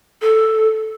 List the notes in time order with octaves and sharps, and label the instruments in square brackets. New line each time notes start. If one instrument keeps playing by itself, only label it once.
[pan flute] A4